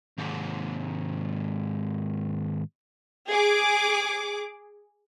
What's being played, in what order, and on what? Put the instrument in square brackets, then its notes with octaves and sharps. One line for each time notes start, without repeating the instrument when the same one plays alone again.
[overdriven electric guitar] D#2 G#2
[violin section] G#4 D6